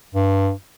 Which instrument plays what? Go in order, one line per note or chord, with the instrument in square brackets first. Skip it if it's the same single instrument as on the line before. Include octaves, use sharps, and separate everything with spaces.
[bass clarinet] G2